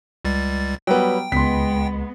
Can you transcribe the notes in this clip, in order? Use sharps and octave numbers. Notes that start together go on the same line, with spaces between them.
C#2 G3 A6
F#3 G3 B3 G5
C#2 G#3 B3 C6 B6